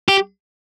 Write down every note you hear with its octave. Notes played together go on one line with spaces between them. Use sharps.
G4